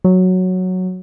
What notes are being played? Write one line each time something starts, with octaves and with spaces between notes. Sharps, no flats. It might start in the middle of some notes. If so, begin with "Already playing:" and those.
F#3